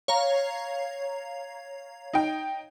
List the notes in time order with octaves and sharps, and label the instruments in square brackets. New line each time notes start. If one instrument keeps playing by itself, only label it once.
[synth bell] C#5 F5 A#5
[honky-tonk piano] D#4 G5